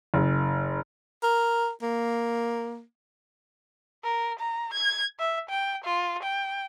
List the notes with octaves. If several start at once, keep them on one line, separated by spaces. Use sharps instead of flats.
F#1
A#4
A#3
A#4
A#5
G#6
E5
G5
F4
G5